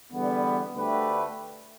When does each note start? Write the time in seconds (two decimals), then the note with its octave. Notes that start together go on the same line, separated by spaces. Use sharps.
0.12 E2 D3 G3 B3
0.75 D2 D3 A3 G4 B4